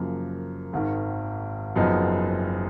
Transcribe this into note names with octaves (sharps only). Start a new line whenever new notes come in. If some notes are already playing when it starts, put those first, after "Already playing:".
Already playing: F#2 C#3 F3 A#3
G#1 G#2 D#3
F#1 F#2 F3 B3 D#4